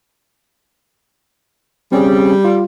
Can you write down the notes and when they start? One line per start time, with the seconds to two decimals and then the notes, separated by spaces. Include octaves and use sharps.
1.92 G3 C4 C#4 G#4
2.45 F4